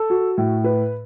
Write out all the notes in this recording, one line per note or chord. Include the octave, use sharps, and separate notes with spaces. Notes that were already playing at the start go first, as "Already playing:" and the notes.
Already playing: A4
F#4
A2
B4